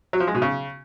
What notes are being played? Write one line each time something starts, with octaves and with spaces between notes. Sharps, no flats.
F#3
F3
G#3
B2
C#3